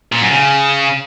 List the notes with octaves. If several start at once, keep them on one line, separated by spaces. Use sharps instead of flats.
A#2
F#2
C#3